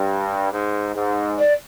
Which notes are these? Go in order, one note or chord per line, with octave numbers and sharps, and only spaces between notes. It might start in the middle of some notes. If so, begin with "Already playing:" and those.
Already playing: G2
G#2
G#2
D5